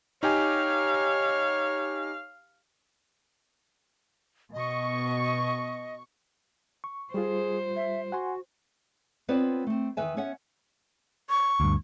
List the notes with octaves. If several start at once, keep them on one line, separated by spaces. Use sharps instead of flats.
D#4 G4 C#5 F5 G#5
B2 D#5 C#6
C#6
G3 F4 G#4 C5
E5
F#4 F#5 G#5 C6
B3 C4 F4 B4 C#5 D5
A3 C4
E2 D#3 B4 E5 G#5
B3 C#4 C#5 E5 F#5
C#6
D2 G2